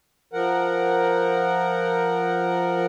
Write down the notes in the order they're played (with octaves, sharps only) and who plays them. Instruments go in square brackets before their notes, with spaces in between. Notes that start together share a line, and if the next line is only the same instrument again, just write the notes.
[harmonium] F3 A#4 F#5